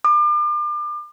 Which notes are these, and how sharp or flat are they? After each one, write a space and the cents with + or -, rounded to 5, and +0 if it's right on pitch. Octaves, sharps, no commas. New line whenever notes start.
D6 +35